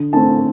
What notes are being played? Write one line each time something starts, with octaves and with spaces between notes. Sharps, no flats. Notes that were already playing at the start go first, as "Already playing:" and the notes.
Already playing: D3
A3 C4 A5